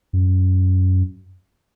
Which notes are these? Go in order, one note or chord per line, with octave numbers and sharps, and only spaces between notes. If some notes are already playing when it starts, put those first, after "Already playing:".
F#2